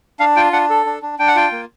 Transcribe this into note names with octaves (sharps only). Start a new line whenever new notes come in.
D4 F5
F4 G5
D4 F#5
A4
D4
D4
D4 G5
F#5
F4 G5
A#3